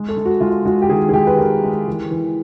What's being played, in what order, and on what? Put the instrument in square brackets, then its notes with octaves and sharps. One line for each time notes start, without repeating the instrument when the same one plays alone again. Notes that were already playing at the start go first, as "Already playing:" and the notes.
Already playing: [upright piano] G#3
A4
G#3
F#4
G#3 F4
G#3 F#4
G4
D#3 G#4
G#4
G#3 G4
B4
D#3 A#4
G#3
E3
E3